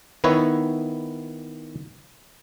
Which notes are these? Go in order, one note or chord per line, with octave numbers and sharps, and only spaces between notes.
D#3 B3 E4 B4 C#5